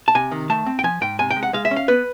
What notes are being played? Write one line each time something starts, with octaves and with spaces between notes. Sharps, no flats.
A5
C3 G#5
D#3
A3 A5
C4
G5
F3 G#5
G#2 G5
C3 G#5
G5
G#3
F#5
G#3 F5
E5
C#4
F5
B3 B4